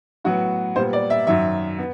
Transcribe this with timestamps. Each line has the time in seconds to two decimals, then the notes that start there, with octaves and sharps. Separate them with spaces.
0.24 A2 F#3 B3 F#4
0.76 A#2 G3 B3 C5
0.93 D5
1.10 E5
1.27 F#2 D#3 F#3 E5
1.78 B3